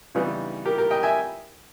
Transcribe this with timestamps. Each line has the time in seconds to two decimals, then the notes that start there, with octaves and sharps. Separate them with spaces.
0.15 C#3 E3 G3 B3 D#4
0.65 G4 A#4
0.78 G4 A#4
0.91 D#5 G5
1.03 E5 G#5